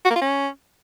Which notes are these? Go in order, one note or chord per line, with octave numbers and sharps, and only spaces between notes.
F#4
A#3
F4
C#4